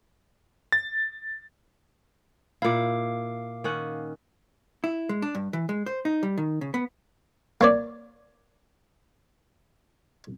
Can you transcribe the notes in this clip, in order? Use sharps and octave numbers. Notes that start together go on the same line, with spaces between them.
A6
A#2 E4 F5 D6
D#3 C#4 F#5
E4
G#3
D4
G2
E3
G#3
C5
D#4
G3
D#3
C#3
B3
A#3 C#5 D5